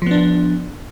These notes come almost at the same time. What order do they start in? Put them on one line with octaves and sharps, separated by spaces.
F3 B3 D4